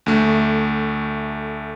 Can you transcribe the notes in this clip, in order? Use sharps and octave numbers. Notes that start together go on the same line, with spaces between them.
D2 A3